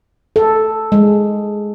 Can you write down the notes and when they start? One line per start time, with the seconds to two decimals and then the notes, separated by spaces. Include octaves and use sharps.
0.36 A4
0.92 G#3